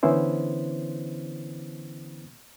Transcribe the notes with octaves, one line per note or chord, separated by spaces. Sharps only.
D3 E3 B3 C#4 E4 C5